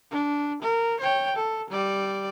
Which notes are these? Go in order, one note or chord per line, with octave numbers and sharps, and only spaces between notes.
D4
A#4
C#5 G5
A4
G3 D5